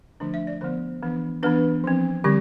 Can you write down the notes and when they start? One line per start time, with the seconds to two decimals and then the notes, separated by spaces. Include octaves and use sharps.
0.20 D3 F3 A3 D4
0.34 E5
0.47 D5
0.61 D3 F3 B3 C5
1.03 E3 B3 D4
1.43 E3 B3 D4 B4
1.84 F3 C4
2.24 D3 G3 C4 G4